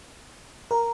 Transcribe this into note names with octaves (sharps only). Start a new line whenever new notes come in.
A#4